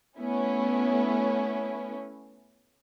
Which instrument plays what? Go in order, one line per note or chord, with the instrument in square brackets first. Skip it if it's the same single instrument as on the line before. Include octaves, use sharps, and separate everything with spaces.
[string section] A3 B3 C#4 E4